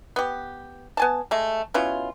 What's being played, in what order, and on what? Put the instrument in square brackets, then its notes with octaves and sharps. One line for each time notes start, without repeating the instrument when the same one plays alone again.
[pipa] B3 G4
B3 G#5 A5
G#3 A3
B2 C#4 E4 F4